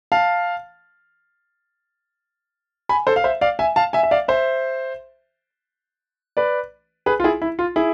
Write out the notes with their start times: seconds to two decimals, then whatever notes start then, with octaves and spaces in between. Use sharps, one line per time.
0.12 F5 A5
2.89 G#5 B5
3.07 A4 C5
3.16 F5
3.24 C5 E5
3.41 D5 F5
3.59 E5 G#5
3.76 F5 A5
3.93 E5 G#5
4.03 E5
4.11 D5 F5
4.28 C5 E5
6.37 B4 D5
7.06 G#4 B4
7.20 F4
7.24 E4 G#4
7.42 E4
7.59 F4
7.76 E4 G#4